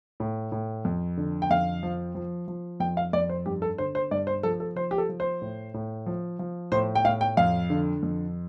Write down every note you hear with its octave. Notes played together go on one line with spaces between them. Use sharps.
A2
A2
F2
D3
G5
F2 F5
F3
F3
F3
F2 G5
F5
F2 D5
C5
G2 G4
A4
D3 C5
C5
G2 D5
C5
F3 A4
A4
F3 C5
G4
A4
F3
C5
A2
A2
F3
F3
A2 C5
G5
A2 F5
G5
F2 F5
D3
F2